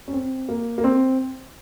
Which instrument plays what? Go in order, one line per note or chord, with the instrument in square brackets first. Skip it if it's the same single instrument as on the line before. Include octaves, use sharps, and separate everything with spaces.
[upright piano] C#4
C4
A#3
A#3
C4